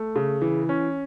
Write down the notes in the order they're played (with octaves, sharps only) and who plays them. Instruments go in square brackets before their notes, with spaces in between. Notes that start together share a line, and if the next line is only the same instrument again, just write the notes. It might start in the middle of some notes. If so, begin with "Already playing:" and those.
Already playing: [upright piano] A3
C#3
E3
C#4